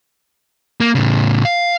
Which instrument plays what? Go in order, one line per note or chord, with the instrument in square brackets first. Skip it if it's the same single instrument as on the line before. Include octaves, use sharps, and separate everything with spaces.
[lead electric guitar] A#3
A2 C#3
F5